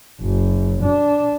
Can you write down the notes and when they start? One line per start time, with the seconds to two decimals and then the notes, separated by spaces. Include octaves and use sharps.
0.21 F#1
0.83 D4